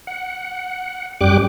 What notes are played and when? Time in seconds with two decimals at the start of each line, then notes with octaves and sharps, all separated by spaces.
0.07 F#5
1.21 F#2 G3 G4 G5 D6 F#6